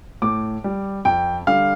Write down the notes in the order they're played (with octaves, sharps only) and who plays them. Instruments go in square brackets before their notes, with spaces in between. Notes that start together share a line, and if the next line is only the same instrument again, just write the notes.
[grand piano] A2 D6
G3
F2 G5
D3 G3 F5